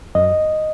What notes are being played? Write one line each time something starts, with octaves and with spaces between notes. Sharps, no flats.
F#2 D#5